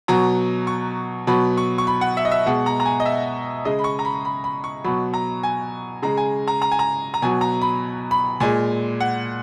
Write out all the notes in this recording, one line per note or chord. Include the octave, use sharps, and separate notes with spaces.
B2 F#3 A#5
C#6
B2 F#3 B5
C#6
C#6
B5
F#5
E5
D#5
E5
B2 G#3 F#5
A#5
A#5
G#5
D#5
E5
C#3 G#3 D#5
B5
C#6
A#5
B5
B5
B5
C#6
B2 F#3 B5
A#5
G#5
C#3 G#3 A#5
G#5
A#5
A#5
G#5
A#5
A#5
B2 F#3 G#5
A#5
B5
B5
A#2 G#3 G#5
F#5